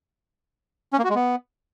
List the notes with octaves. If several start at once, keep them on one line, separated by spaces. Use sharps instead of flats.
C#4
A#3
F#4
G#3
B3